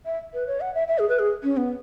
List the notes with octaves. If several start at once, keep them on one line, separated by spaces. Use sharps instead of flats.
E5
B4
C#5
F#5
E5
E5
G#4
B4
G#4
C#4
B3